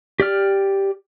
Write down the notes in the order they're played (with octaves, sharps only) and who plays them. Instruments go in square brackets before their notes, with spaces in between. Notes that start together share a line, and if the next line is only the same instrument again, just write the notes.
[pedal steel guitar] G4 D5 F6